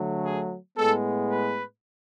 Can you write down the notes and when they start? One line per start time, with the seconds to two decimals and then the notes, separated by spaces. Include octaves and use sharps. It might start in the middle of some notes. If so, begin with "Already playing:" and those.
Already playing: D3 F#3 A3
0.24 G#4
0.76 A2 G#3 B3 A4
1.30 B4